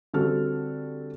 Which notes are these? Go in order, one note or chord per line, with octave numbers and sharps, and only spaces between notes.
D3 G3 C4 F#4 A4 F6